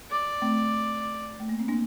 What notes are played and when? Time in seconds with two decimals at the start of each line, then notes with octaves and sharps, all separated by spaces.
0.10 D5
0.42 A3 C4
1.40 A3
1.49 A#3
1.59 C4
1.68 A#3 D4